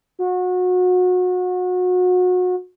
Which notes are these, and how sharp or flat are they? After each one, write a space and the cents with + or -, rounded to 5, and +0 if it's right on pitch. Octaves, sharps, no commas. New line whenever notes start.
F#4 -30